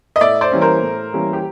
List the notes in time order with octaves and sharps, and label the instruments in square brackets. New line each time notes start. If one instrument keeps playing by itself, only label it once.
[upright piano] D#5
A2 D5 E5
C5 D5
E3 G3 A#3 C#4
A#4 C5
A2
E3 G3 A#3 C#4
G4